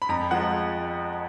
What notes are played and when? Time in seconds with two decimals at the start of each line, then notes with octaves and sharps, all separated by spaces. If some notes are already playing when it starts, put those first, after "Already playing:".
0.02 B5
0.09 F2 A#5
0.31 F3 G#3 F#5